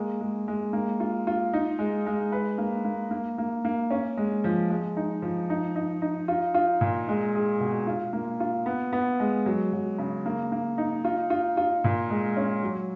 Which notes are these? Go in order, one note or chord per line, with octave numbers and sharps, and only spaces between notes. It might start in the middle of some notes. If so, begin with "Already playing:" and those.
Already playing: G#3 A#3
G#3
G#3
A#3
F4
F4
D#4
G#3
G#3
B4
A#3
A#3
A#3
A#3
A#3
C#4
G#3
F3
G#3
D#4
F3
D#4
D#4
D#4
F4
F4
A#2
G#3
G#4
B2
F4
A#3
F4
B3
B3
G#3
F#3
F#3
C#3
A#3
A#3
D#4
F4
F4
F4
A#2
G#3
C#4
F#3